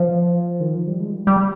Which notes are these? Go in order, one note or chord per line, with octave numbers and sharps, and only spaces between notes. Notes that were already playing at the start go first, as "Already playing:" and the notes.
Already playing: F3
D#3
F3
G3
G#3
G3
G3